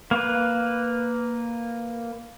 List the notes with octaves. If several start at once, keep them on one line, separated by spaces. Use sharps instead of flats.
A#3 B4